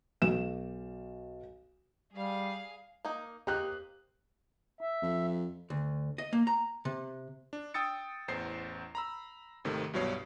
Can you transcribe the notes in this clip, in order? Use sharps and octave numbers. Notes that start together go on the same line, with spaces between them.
B1 E7
G3 G#4 F5
A#3 D#4
A#3 C4 D#4 G4 F#6
E5
F2
D2
D#5
A#3
A#5
C3
D4
G5 D#6 E6 A6 C#7
A1 E2 C5 C7
A#5 B5 E6
G#1 C3 D#3 A3
C2 G2 B2 F#3 C#5 C7